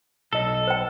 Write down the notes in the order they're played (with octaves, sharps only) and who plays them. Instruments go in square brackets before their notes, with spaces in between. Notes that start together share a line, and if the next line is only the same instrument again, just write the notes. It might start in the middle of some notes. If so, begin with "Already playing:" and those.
[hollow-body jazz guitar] B1 D#5 [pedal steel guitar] A4
[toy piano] C5 G5